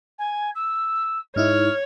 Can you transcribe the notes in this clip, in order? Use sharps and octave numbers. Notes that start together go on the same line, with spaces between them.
G#5
E6
G#2 D#4 E4 C#5 F6